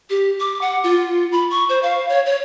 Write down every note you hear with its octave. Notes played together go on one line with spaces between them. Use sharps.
G4
D6
F#5
F4
B5
C#6
C5
F5
C#5
C#5